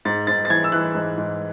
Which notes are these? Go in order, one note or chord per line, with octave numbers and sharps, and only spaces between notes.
G#2 A6
G#2 A6
A6
E3 G#6
E6
E3 F#6
G#2
G#2